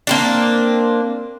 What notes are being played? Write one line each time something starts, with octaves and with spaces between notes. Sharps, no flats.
A#3 C4 D4